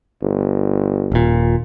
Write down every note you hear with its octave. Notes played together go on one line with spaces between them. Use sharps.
G1
D#1 A#2